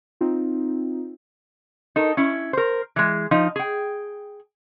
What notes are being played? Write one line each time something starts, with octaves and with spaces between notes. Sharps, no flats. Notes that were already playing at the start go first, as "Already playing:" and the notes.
C4 D#4 F4
D#4 A4 A#4
C#4 E4
A#4 C5
E3 G#3
F3 D#4
G#4 G5